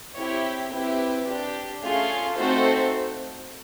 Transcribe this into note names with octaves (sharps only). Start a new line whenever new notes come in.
C4 E4 G4 C#5
C4 E4 G4 B4
D4 G4
A3 C#4 F4 G#4
A3 C4 D#4 F#4 A4 C5